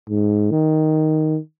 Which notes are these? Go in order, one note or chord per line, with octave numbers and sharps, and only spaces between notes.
G#2
D#3